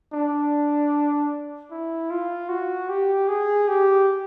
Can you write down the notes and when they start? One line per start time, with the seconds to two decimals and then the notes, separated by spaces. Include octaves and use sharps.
0.13 D4
1.71 E4
2.10 F4
2.49 F#4
2.89 G4
3.28 G#4
3.68 G4